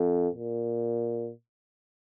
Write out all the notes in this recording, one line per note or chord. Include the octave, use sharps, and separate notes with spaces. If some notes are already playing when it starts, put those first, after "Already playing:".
Already playing: F2
A#2